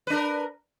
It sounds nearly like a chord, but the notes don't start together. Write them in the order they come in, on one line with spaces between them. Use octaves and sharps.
B4 D4 A#4